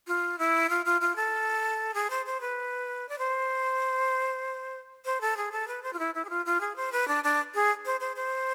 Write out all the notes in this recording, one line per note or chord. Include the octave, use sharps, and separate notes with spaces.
F4
E4
F4
F4
F4
A4
G#4
C5
C5
B4
D5
C5
C5
A4
G#4
A4
B4
C5
F4
E4
E4
G#4
F4
F4
G#4
C5
B4
D4
D4
G#4
C5
C5
C5